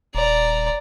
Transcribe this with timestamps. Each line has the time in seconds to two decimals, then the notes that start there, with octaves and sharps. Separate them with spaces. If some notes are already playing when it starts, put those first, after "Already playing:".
0.15 D#1 D5 A#5